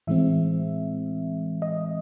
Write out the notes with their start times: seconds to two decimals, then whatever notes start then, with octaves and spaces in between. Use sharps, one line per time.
0.07 A2 E3 G#3 C4 E5
1.62 D#5